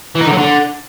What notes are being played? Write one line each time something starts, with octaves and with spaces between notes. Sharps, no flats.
E3
D#4
D3
F#3
D3